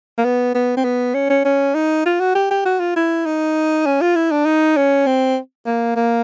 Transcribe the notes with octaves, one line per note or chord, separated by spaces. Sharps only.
A#3
B3
B3
C4
B3
C#4
C#4
C#4
D#4
F4
F#4
G4
G4
F#4
F4
E4
D#4
C#4
F4
E4
D4
D#4
C#4
C4
A#3
A#3